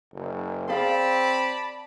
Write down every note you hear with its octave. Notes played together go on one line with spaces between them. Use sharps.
F#1
C4 G#4 D5 F5 A5 B5